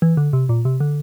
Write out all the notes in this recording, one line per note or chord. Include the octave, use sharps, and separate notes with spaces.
E3
D3
C3
A#2
C3
D3